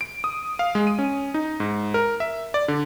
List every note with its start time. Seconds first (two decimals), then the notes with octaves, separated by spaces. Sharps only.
0.01 D7
0.24 D#6
0.59 F5
0.75 G#3
0.87 D#7
0.99 C#4
1.34 D#4
1.60 G#2
1.94 A#4
2.20 E5
2.54 D5
2.68 D3